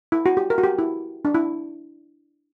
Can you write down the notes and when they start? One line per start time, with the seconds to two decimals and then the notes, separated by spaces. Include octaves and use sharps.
0.12 E4
0.26 F#4
0.37 G4
0.50 A#4
0.58 F#4
0.63 G4
0.79 E4
1.25 D4
1.35 E4